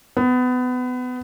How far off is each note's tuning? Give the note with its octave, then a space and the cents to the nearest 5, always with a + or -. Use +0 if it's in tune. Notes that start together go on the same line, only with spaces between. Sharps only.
B3 +25